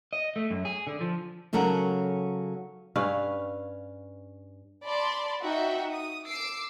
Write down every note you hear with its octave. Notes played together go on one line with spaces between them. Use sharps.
D#5
A3
F#2
G#4
D3
F3
C#3 F#3 C#4 A4 A#4 F#5
G2 C#4 B4 F5
D5 A5 B5 C6
D#4 F#4 E5 G5
D#6
D6 E6 C7 D7